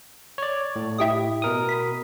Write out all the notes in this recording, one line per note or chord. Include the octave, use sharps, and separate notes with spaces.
C#5 D5
A2
E4 G4 D#5
B2 A#4 D#6
B5